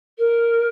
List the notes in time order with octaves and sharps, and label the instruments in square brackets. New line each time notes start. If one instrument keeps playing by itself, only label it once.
[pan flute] A#4